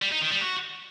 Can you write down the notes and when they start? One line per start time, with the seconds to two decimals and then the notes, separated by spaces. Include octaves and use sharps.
0.02 G3
0.12 D#4
0.22 D#3
0.31 G3
0.41 F#4